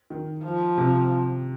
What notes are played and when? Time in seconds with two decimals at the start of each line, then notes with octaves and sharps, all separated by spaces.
0.10 D#3
0.44 F3
0.77 C3